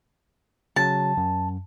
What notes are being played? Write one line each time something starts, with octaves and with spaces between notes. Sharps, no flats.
C#3 F#3 A5
F#2